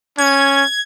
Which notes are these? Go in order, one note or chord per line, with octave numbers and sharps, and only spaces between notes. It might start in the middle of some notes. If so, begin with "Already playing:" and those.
C#4 G#6